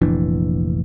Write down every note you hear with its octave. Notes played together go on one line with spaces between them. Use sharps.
F1 A#1 E3 D4